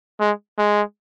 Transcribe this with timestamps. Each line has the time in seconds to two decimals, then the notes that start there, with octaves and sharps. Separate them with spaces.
0.20 G#3
0.58 G#3